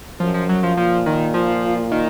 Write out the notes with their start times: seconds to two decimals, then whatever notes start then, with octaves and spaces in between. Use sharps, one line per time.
0.20 F#2 F3
0.34 F3
0.49 F#3
0.63 F3
0.77 A#2 F3
1.06 D#3
1.34 F3
1.92 D#3